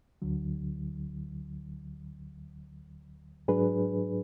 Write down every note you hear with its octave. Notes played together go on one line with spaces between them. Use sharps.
D2 D3 F#3
G#2 F#3 D4 G#4 B4